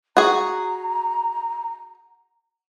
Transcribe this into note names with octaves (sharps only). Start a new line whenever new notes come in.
F#4 G#4 A#5